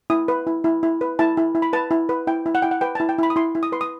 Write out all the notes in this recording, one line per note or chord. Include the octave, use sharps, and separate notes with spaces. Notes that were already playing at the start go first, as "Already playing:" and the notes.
E4 D#6
B4
E4
E4
E4
B4
E4 A5
E4
E4
B5
B4 A5
E4
B4
E4 G5
E4
F#5
E4 G5
F#5
B4 G5
A5
E4
G5
E4 B5
D#6
E4 C6
E4
D#6
B4 C6
D#6